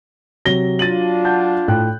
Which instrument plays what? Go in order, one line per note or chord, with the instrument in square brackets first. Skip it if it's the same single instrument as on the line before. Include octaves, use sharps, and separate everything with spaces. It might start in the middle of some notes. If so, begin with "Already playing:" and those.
[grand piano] C3 A#6 [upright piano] F#3 G7
[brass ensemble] D4 F4 [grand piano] A6 D#7 F#7
[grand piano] F#5 A5 G6
A2 G5 F#6